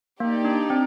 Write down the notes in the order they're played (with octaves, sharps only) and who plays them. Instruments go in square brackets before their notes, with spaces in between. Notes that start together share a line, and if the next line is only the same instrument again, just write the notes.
[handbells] A#3 [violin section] D#4 G4 D5
[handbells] D4
C4